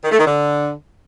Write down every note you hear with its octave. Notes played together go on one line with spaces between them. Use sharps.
D#3
A3
D#3
D3